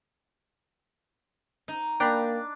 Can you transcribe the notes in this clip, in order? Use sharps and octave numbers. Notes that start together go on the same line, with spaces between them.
D#4
A#3 D4 G5 A#5 B5